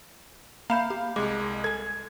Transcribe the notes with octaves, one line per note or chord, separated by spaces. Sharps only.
A#3 E5 F5 A#5 B5 G6
G4
C2 G#3 D6
A4 G#5 G#6